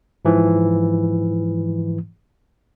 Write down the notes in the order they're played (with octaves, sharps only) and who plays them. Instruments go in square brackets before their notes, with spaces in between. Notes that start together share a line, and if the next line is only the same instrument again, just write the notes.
[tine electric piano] G#2 E3 F3